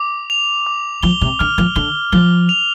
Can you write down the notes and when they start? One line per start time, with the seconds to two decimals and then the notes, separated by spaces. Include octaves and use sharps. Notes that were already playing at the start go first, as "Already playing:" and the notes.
Already playing: D6 F7
0.30 F7
0.66 D6
1.03 F3 G7
1.21 C3
1.39 D3 F6
1.58 F3
1.76 D3 G7
2.12 F3 G7
2.49 F7